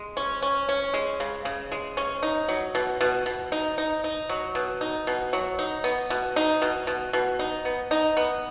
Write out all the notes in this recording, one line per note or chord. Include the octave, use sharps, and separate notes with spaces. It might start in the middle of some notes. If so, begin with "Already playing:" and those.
Already playing: G#3
C#4
C#4
C#4
G#3
C#3
C#3
G#3
C#4
D#4
F#3
B2
B2
B2
D#4
D#4
D#4
F#3
B2
D#4
B2
F#3
D#4
B3
B2
D#4
B2
B2
B2
D#4
B3
D#4
B3